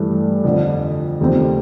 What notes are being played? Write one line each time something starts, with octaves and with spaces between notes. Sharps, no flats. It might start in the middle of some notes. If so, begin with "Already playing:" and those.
Already playing: G2 E3 A3
F2 D3 F3
D#2 C#3 F3 A3 C4